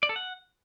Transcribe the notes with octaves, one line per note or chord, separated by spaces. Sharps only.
D5
A4
F#5